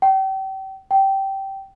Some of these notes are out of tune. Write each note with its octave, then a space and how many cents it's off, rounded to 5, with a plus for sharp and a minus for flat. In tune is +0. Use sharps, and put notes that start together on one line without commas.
G5 -35
G5 -15